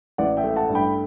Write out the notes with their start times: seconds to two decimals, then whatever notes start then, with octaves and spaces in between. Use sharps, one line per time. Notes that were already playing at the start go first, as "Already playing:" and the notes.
0.18 A1 D5 F#5
0.37 E5 G5
0.44 A3
0.56 F#5 A5
0.69 G2
0.75 G5 B5